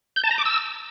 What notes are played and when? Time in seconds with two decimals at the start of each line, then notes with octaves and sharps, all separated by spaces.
0.16 G6
0.24 A5
0.31 A#5
0.38 D6
0.45 E6